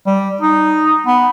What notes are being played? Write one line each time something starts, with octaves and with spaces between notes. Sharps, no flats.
G3
D#4
B3